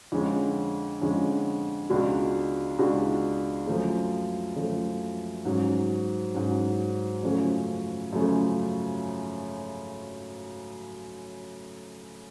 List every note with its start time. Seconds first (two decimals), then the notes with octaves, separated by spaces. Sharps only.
0.12 F2 D3 G#3 C#4 F4
1.01 F2 D3 G#3 C#4 F4
1.90 C#2 B2 G#3 D4 F#4
2.79 C#2 B2 G#3 D4 F#4
3.67 F#2 F3 A3
4.56 F#2 F3 A3
5.45 G#2 F#3 C#4
6.34 G#2 F#3 C#4
7.23 F#2 C#3 F3 A3 C#4
8.13 F#2 C#3 F3 A3 C#4